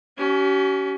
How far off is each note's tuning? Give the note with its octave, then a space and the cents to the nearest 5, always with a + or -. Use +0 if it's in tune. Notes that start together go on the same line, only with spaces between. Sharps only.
C#4 +25 G4 -45